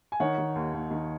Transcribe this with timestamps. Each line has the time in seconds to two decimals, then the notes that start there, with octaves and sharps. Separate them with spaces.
0.12 G#5
0.20 D#3 C#5 F#5
0.38 D#3
0.55 D#2
0.73 D#2
0.91 D#3